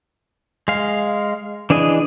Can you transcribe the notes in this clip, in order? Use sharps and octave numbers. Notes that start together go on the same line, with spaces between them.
G#3 F5
E3 D4 G#4 D#5